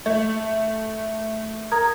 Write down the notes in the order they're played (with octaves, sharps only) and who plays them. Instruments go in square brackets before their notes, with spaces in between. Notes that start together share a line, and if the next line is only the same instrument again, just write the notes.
[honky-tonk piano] A3
[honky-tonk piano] A#4 [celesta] A#5 D#6 G#6